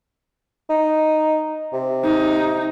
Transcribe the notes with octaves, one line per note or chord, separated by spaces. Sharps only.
D#4
C3
D#4